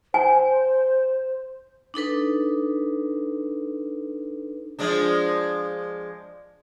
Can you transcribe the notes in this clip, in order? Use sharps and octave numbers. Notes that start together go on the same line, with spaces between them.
C5 G#5
D4 D#4 A4 B4
F3 G#3 D4